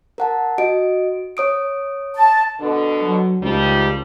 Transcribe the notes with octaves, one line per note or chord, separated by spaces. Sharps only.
A#4 F#5 A5
F#4 D#5 D7
C#5 D#6 D7
A5
B2 D3
F#3
C#2 D#3 F3 G3